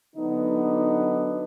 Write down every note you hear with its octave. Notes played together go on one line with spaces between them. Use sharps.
D3 F#3 B3 D4 D#4